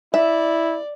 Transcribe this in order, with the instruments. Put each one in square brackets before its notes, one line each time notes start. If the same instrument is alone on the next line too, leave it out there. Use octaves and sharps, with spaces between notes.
[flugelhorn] E4 [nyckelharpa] D5 [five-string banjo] E5